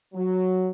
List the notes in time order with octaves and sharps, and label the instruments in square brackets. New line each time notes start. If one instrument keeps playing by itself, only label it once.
[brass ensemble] F#3